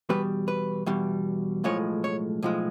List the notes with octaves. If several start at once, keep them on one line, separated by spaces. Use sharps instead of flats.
E2 B2 G3 B4
B4
E2 B2 G3
B1 A2 F3 G#3 C#5
C#5
B1 A2 F3 G#3